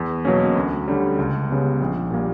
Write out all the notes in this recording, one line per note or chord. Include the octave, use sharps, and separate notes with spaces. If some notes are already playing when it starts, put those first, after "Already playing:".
Already playing: E2
B2 F#3 A#3 C#4
D2
D3 G3 C#4
C#2
C#3 G3 B3
A#1
A#2 G3 A#3